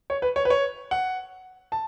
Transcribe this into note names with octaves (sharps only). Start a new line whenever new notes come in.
C#5
B4
C#5
B4
C#5
F#5
A5